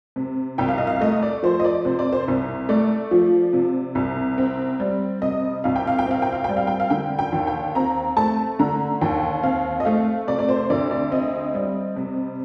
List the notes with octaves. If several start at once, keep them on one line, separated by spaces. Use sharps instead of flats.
C3
C2 G5
F5
D#5
F5
A3 D#5
D5
F3 C5
D#5
D5
C3 C5
D5
C5
C2
A3 D5
F3
C3
C2
C4
G3
C3 D#5
C2 F5
G5
F5
G5
C4 F5
G5
F5
G3 G5
F5
G5
F5
D3 G5
G5
D#2
G5
C4 A#5
A3 A5
D3 A#5
D#2 G5
C4 F5
D#5
A3 F5
C3 D5
D5
C5
D2 D5
D5
C4 D#5
G3
C3